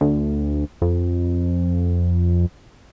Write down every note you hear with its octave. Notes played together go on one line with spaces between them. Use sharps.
D2
F2